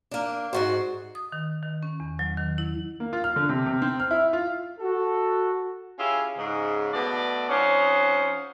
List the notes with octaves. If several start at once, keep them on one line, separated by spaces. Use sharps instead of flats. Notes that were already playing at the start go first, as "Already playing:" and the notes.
A#3 D4
G#2 B2 F#4 C5
D#6
D#3
D#3
C#4
E2
F#3
D#3
E4
A#3
F4
F6
D3
C3
C3
C4
F6
E4
F4
F#4 A4
C#4 E4 F4 G4 G#4
G#2 C#3
B2 A3 D5
F2 C#4 D#4 C5 F#5